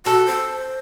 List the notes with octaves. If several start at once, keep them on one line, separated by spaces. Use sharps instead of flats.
F#4 A4
C5